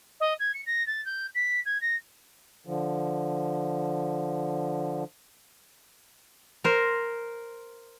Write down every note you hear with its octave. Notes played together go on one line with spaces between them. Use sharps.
D#5
G#6
C#7
A#6
A6
G6
B6
G#6
A#6
D3 F3
A#4 C5